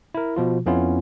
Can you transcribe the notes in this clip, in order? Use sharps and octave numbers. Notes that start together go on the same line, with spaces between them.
E4 A#4
B2 F3 F4
F2 B3 C#4 E4 F4